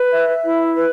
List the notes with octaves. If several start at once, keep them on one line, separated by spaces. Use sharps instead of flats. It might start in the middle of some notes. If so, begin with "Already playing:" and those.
Already playing: B4
E5
E4
B4